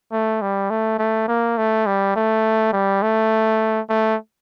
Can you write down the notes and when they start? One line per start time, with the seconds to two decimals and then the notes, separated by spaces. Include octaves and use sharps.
0.12 A3
0.41 G3
0.70 A3
0.99 A3
1.28 A#3
1.57 A3
1.86 G3
2.16 A3
2.73 G3
3.02 A3
3.90 A3